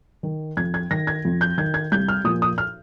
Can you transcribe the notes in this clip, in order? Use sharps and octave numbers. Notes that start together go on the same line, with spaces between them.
D#3
F2 G#6
G#6
D#3 A#6
G#6
F2
G6
D#3 G#6
G#6
C2 G6
F6
A#2 F3 D#6
D#6
F6